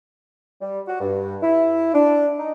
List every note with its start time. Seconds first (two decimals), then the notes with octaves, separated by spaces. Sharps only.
0.61 G3
0.87 F#4
1.00 G2
1.42 E4
1.94 D4
2.39 D#4